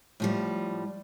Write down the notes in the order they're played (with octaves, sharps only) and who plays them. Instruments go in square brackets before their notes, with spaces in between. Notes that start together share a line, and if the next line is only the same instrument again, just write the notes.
[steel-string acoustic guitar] A2 F3 G3